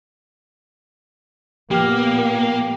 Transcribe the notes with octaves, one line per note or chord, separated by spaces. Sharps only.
A#2 F3 A#3 B3 G4 F6